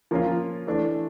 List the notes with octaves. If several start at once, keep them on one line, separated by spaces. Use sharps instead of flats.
F3 A#3 C#4 F4
E3 A3 D4